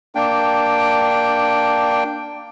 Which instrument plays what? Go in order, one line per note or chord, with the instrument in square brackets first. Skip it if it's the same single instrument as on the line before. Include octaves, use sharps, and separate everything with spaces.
[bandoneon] A#3 D4 G5